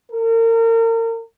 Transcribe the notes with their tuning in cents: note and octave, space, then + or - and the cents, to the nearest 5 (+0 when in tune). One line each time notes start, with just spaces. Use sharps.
A#4 -35